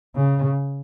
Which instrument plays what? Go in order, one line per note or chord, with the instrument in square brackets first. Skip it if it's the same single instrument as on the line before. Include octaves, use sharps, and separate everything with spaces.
[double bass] C#3